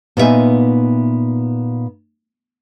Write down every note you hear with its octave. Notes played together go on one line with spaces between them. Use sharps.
A#2 B3 D#4 F4 E5 G#5